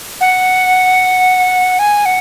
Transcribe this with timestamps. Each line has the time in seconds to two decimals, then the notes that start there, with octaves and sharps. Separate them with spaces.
0.21 F#5
1.79 G#5
2.06 F#5